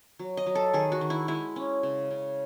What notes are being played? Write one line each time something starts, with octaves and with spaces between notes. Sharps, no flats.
F#3
D#5
F#3
A4
D#3 G#4
F#4
D#3
E4
G#3 E4
C#4
C#3
C#3